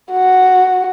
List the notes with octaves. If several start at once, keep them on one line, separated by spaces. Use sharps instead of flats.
F#4